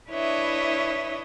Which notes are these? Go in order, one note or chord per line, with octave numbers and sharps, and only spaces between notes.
D4 E4 B4 C#5 D#5 E5